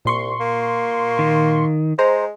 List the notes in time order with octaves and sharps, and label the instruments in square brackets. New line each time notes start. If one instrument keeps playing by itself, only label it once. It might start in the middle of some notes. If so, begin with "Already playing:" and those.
[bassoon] C2 [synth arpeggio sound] A#2 C6 C#6
[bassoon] A#3
[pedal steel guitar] D#3
[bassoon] G#3 [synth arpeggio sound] C5 A#5